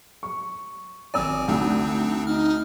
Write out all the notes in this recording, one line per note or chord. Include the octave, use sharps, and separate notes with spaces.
C#6
G#1 C4 D5 G#5 D#6 E6
D2 C4 D4 D#4
D#4 F6